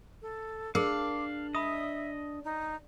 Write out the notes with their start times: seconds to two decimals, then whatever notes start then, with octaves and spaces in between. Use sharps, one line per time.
0.22 A4
0.75 D4 G#4 A#4 F5 D6
1.55 D#5 E5 B5 D#6
2.45 D#4